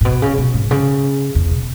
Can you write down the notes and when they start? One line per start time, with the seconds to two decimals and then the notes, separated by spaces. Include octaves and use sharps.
0.01 A2
0.05 B2
0.22 C#3
0.38 B2
0.54 G#2
0.71 C#3
1.35 E2
1.51 B2